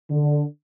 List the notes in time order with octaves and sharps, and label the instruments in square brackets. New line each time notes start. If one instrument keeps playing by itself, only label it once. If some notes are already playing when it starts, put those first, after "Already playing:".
[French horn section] D3